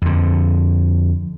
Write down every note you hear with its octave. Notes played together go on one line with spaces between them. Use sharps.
F2 D3